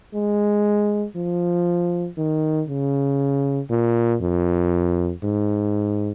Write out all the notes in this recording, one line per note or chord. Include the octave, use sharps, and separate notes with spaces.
G#3
F3
D#3
C#3
A#2
F2
G#2